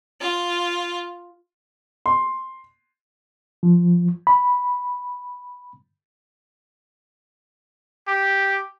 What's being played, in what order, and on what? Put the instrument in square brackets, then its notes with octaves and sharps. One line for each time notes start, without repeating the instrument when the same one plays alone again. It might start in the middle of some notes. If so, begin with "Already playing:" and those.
[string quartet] F4
[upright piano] C6
[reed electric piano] F3
B5
[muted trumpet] G4